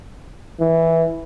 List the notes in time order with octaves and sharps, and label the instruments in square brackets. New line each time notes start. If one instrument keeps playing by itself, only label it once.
[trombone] E3